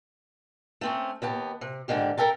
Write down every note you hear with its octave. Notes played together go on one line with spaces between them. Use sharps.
A3 C4 C#4
D#2 B3 G4 A5
C3
G#2 B2 D3 D#3 G4
A4 A#4 E5 G5 A5